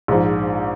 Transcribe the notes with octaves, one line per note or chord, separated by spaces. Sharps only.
A#1 G#2 F3